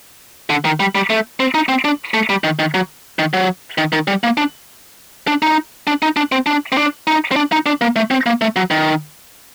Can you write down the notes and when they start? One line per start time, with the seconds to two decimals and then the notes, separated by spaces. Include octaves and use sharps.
0.50 D3
0.65 D#3
0.80 G3
0.95 G3
1.10 A3
1.40 C4
1.54 D#4
1.69 C4
1.85 D4
2.14 A3
2.29 G3
2.44 D#3
2.59 D#3
2.74 F#3
3.19 D#3
3.34 F#3
3.78 D#3
3.93 D#3
4.08 G3
4.24 A#3
4.37 D4
5.27 D4
5.42 D#4
5.87 D4
6.02 D#4
6.17 D4
6.32 C4
6.46 D4
6.72 C4
6.77 D4
7.07 D#4
7.32 C4
7.36 D4
7.52 D#4
7.66 D4
7.81 A#3
7.96 A3
8.11 C4
8.26 A#3
8.41 A3
8.56 F#3
8.71 D#3